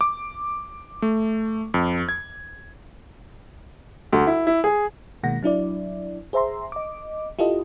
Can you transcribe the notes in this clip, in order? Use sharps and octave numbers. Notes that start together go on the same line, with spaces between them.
D6
A3
F2
G#6
D2
E4
E4
G#4
B2 D#3 G#3 A#3 F#5 A#6
F#3 D4 E4 D5
G#4 C5 E5 A#5 C6
D#5 D6
E4 F4 G4 A4 D#5